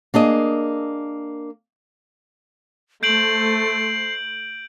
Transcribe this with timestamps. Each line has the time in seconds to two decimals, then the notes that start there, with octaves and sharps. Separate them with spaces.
0.14 A#3 D4 G#4 D#5
3.03 A3 C5 G6 C7 D7 F#7